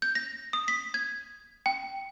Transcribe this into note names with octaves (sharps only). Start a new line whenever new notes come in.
G6
A#6
D#6
B6
G#6
G5